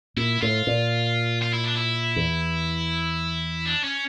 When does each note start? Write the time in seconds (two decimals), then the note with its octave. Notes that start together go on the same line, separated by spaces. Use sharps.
0.17 A#2 E4
0.41 A2 F4
0.67 A#2
1.42 F4
1.53 E4
1.64 D4
1.75 E4
2.16 E2
3.66 D4
3.84 C#4